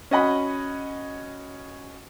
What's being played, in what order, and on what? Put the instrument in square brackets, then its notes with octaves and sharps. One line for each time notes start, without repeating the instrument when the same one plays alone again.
[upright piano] C#4 F#4 D#5 F#5 B5